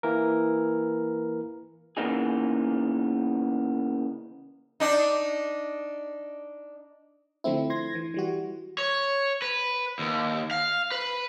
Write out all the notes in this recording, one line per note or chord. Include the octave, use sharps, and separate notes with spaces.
E3 A#3 A#4
C#3 E3 A#3 B3 D#4 G#4
D4 D#4
D3 F3 A3 C4 E4
C6 G#6 A#6
E3
E3 G3 F#4
C#5
B4
D#2
F5
B4